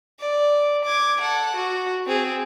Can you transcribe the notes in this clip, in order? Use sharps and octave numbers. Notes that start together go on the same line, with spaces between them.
D5
D6 G#6
A4 F#5
F#4
C4 G#4